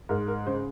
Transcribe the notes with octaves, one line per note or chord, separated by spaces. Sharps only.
G#2 A#4
A#4
C#3 C5